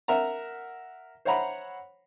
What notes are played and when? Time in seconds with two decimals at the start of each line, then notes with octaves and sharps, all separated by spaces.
0.08 A#4 E5 F#5 A#5
1.25 C5 C#5 E5 F#5 A#5 B5